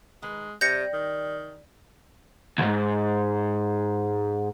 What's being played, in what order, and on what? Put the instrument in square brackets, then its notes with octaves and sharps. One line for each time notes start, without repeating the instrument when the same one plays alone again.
[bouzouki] D#3 B4 [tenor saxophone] G#3
[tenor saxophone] C3 [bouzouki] G3 [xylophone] G6 A#6 C#7
[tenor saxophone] D#3
[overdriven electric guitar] D2 G#2